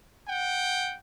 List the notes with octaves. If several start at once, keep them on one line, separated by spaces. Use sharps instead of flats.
F#5 G5